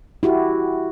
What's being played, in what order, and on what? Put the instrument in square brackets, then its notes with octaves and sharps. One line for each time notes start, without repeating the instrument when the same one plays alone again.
[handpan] E4 F#4 G4